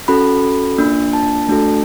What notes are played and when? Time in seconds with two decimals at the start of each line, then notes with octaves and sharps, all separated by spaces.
0.08 C#4 F#4 A4 B5
0.78 A#3 D4 F4
1.13 A5
1.48 A3 D4 F#4 A4